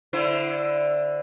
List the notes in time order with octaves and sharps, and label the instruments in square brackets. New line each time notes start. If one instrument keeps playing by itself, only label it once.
[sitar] D3 E4 C5